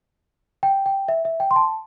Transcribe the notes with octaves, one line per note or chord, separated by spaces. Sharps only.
G5
G5
E5
E5
G5
C6
A5